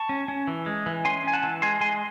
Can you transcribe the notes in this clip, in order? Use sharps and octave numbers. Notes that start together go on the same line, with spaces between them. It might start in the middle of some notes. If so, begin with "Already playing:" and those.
Already playing: A5 C#6
C#4
C#4
E3
G#3
E3
C#4 G#5 C6
C#4 G#5
F#5 A5
E3
G#3 G#5 C6
G#3 G#5 C6